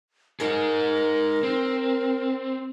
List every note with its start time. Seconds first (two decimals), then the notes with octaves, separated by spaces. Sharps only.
0.40 D#4 G#4 A#4
1.43 C4